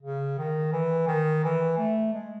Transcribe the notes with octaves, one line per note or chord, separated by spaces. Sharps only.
C#3
D#3
E3
D#3
E3
A3
G#3